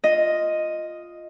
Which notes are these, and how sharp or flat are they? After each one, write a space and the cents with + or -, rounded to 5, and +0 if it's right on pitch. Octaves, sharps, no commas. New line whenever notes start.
F4 +0 D#5 +0